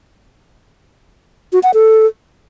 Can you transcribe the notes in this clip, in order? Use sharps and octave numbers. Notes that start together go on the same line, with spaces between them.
F#4
F#5
A4